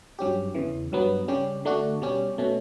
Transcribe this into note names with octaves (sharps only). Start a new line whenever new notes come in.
G2 F#3 C#4 G4
E2 C#3 E3
G2 F#3 B3
C#3 G3 C#4 G4
D3 A3 D4 F#4
B2 G3 C#4 G4
B2 A3 C#4